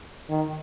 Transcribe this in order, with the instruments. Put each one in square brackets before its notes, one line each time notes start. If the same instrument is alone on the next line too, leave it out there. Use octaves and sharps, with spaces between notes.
[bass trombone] D#3